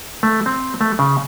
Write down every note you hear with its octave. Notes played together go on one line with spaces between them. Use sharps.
A3
C4
A3
C#3